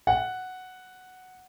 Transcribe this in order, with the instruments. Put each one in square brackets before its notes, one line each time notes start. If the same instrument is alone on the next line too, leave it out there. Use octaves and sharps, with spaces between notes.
[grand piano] F#5